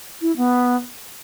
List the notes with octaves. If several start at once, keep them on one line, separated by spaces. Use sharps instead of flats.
E4
B3